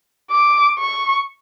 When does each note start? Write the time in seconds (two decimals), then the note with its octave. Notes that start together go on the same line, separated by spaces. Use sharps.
0.31 D6
0.79 C#6